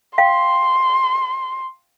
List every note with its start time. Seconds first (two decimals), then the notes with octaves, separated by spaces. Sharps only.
0.18 F5 G5 C6